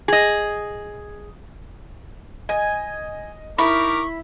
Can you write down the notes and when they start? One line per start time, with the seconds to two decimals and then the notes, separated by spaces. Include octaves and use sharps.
0.08 G#4 D#5
2.49 D#5 G#5
3.58 D#3 E4 A#4 B5 C#6 D6